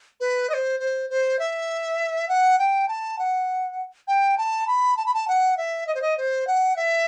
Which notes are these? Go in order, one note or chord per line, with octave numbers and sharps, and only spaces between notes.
B4
D#5
C5
C5
C5
E5
F#5
G5
A5
F#5
G5
A5
B5
A5
B5
A5
F#5
E5
D#5
C5
D#5
C5
F#5
E5